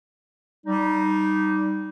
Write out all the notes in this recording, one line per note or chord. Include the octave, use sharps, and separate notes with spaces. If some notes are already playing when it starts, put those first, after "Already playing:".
G3 D#4